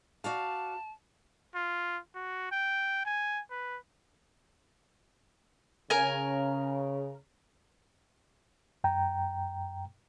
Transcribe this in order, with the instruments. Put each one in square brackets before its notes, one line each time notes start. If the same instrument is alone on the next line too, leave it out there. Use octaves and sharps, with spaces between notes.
[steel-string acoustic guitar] F#4 D5 F5 [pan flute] A5
[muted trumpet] F4
F#4
G5
G#5
B4
[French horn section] C#3 [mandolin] A#4 G#5
[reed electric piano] F#2 G5 A#5